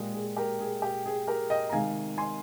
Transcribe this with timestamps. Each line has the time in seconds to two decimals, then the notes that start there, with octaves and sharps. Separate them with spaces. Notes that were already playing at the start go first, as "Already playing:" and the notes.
Already playing: A#2 G#3 G4
0.14 G#4
0.37 G4 A#4
0.60 G#4
0.82 G4
1.06 G#4
1.27 G4 A#4
1.50 D#5 G5
1.69 A#5
1.73 C3 D#3 G#3 F5 G#5
2.18 G#5 C6